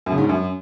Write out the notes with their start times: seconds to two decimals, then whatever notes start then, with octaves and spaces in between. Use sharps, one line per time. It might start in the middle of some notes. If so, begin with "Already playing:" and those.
0.06 F#2
0.12 C#3
0.18 G#2
0.23 G2
0.29 F#2